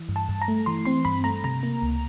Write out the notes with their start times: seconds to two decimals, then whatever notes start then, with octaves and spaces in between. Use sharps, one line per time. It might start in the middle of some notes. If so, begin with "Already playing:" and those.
Already playing: E3
0.09 G2
0.16 A5
0.29 G2
0.42 A#5
0.48 A3
0.66 E3 C6
0.85 C4 C6
1.05 G2 B5
1.24 A3 A#5
1.44 C3 A#5
1.63 A#3
1.82 C#2